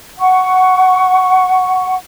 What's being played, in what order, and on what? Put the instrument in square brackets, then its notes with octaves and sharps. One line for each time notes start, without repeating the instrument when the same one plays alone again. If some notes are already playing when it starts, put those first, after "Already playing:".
[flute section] F#5 C#6